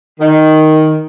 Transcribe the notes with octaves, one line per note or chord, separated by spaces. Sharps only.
D#3